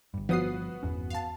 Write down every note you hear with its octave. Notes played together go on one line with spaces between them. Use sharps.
G1 G2
F3 B3 F#4 D#6 C7
G1 E2 C#4
F5 A5